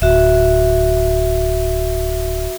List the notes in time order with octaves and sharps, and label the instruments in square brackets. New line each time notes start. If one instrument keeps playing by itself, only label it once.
[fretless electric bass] D1 [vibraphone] F#4 E5